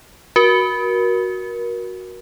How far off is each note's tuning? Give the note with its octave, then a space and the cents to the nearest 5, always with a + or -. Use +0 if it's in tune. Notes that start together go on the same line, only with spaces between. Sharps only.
F#4 +0 A#4 +25